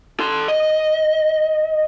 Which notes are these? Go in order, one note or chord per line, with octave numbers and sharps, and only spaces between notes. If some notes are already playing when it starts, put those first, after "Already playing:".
A4 C6
D#5